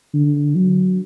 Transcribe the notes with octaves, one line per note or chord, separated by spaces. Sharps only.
D3
F#3